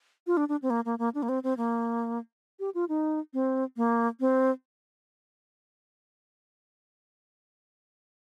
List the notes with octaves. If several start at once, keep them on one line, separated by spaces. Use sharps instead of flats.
F4
D4
D4
C4
A#3
A#3
A#3
D4
A#3
C4
C4
A#3
G4
F4
D#4
C4
A#3
C4